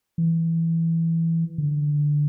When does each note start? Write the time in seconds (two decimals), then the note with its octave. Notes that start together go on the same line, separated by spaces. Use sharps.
0.18 E3
1.58 D3